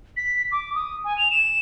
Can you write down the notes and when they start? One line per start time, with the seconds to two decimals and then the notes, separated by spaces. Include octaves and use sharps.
0.17 B6
0.52 D6
0.75 D#6
1.04 G#5
1.18 F7
1.31 E7